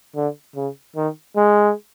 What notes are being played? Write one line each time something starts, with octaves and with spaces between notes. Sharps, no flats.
D3
C#3
D#3
G#3